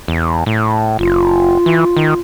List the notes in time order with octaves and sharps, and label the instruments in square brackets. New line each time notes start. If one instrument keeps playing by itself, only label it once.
[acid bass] E2
A2
[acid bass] F#1 [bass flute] F4
[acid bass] E3
D#3